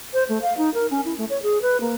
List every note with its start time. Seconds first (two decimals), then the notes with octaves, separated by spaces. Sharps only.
0.14 C5
0.29 A3
0.42 F5
0.58 D#4
0.74 A#4
0.90 C#4
1.05 E4
1.18 A3
1.30 C#5
1.43 G#4
1.62 B4
1.81 A#3